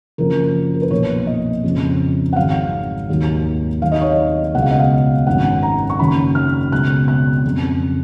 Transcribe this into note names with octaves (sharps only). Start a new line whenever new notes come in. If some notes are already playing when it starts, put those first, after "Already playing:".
F#1 F#2 F3 A#4
A#4
B4
B1 A#2 F3 C#5
D#5
F2 C#3 F3
F#5
G#1 G#2 D#3 F#3 F5
D#2 D#3 F#3
D#2 D#3 F#3 F5
D#5
C#5
D#5
C#2 B2 F#3 F#5
F5
D#5
F5
G#1 F#2 D#3 F#3 F#5
A#5
C#6
F#1 F#2 D#3 B5
F6
C#2 B2 F#3 F#6
F#6
F2 C#3 F#3